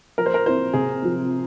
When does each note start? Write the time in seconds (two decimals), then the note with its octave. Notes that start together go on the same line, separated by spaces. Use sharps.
0.18 F3 A#4
0.26 C5
0.34 A#4
0.46 C4 E4 C5
0.74 C3 G#4
1.02 F3 C4